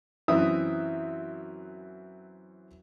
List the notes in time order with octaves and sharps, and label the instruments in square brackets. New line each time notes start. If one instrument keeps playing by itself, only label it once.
[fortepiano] F#2 E3 C4 E5 D#6